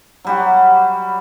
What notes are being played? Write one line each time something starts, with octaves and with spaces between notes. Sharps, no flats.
F#3 G3 F#4